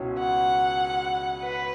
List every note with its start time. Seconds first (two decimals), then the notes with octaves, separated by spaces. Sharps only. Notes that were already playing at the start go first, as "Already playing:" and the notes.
Already playing: C#2 B2 C#4 E4
0.19 F#5
1.43 B4